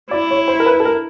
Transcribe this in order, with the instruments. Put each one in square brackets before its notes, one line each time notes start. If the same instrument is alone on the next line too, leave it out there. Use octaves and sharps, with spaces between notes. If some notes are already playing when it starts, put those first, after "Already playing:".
[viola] E4 [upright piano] D5
[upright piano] C#5
C5
A#4
B4
A4
A#4